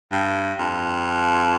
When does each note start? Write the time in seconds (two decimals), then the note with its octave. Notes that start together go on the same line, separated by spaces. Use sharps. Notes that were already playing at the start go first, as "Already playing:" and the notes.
0.12 G2
0.59 F2